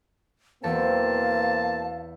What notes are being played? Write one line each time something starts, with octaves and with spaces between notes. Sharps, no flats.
E2 B2 A#3 C4 F5 A5